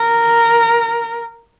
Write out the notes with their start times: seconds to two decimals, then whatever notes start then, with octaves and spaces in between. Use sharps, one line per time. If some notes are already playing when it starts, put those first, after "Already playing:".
Already playing: A#4